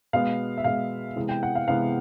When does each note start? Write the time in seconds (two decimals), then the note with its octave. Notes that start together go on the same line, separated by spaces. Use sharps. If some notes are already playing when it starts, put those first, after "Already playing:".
0.13 B2 G#3 B3 F5
0.57 E5
0.64 B2 G#3 B3 F5
1.16 C3 E3 G#3 B3
1.29 G5
1.43 F#5
1.55 F5
1.68 C3 E3 G#3 B3 F5